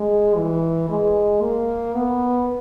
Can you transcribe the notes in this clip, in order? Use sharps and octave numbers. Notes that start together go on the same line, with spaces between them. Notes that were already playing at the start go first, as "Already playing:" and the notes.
Already playing: G#3
E3
G#3
A#3
B3